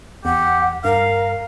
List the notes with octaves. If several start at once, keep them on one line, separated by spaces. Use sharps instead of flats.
E2 G4 F#5
G2 A#4 F5